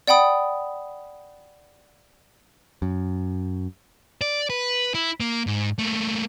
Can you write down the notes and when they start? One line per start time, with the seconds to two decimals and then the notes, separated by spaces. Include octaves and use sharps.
0.08 D5 F#5 G5 B5 D#6
2.82 F#2
4.21 D5
4.50 B4
4.94 E4
5.20 A#3
5.47 G#2
5.78 A3 A#3